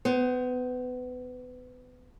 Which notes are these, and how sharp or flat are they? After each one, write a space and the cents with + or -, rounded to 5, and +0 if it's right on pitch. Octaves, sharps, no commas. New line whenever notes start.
B3 +25 C5 +0